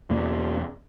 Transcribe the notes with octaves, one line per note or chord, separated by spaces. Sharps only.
E2 B2 A#3